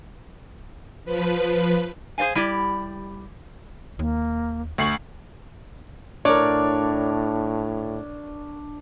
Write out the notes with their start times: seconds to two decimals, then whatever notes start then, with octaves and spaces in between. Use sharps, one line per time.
1.05 F3 B4
2.18 G#4 C5 D5 F5 G#5
2.35 G3 E4 G4 D5
3.99 D#2 A#3
4.78 D2 A3 C#6 C7 F#7
6.25 A2 D4 A#4 C#5 D5